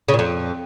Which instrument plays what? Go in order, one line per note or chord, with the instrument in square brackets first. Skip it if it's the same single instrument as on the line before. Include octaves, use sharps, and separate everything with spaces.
[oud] C#3
A#2
F2